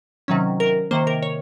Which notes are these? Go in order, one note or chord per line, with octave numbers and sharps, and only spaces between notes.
C3 D#3 F#3 C#4
A#4
C3 D#3 A#3 C5
A#4
C#5